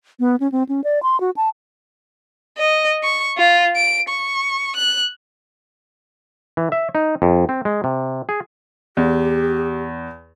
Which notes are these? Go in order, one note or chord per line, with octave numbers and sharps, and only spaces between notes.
B3
C#4
C4
C#4
D5
C6
F#4
A5
D#5
C#6
F4
D7
C#6
F#6
E3
E5
D#4
F2
C4
G#3
C3
G#4
E2 G4